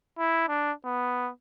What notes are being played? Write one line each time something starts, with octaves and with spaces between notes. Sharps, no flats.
E4
D4
B3